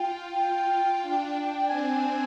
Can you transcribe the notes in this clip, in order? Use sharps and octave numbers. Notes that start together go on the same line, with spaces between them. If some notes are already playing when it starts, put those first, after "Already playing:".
Already playing: F4 G5
G5
D4
G5
C4 G#5